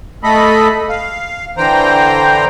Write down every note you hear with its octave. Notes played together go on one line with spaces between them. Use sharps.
A3 A4 D#5 B5
F5
D3 E3 C5 G5 A#5